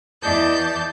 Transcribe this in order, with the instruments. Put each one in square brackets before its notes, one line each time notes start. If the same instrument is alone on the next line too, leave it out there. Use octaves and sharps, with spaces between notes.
[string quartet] E2 E3 D5 D#5 A5 G6